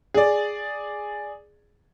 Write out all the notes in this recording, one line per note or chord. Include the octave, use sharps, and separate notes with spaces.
G#4 D5